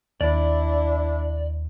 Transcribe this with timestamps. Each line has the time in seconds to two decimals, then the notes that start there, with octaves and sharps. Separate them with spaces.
0.21 D#2 D4 E4 D5